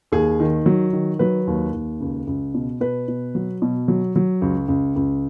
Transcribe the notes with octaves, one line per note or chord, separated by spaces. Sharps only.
D#2 G#4
D#3
F#3
D#3
F#3 B4
D#2
D#2
C#2
C#2
B2
B2 B4
B2
F#3
B2
F#3
F#3
C#2
C#2
C#2